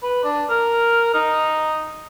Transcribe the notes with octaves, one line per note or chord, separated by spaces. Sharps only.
B4
D4
A#4
D#4